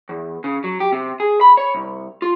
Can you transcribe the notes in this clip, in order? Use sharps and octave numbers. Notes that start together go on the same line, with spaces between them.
E2
C#3
F#3
G4
C3
G#4
B5
C#5
C2
F4